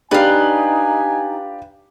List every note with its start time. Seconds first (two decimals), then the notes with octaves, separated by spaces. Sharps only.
0.11 D4 D#4 F4 G4 B4 D5 G#5